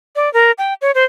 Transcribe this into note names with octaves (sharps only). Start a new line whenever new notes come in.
D5
A#4
G5
C#5
C5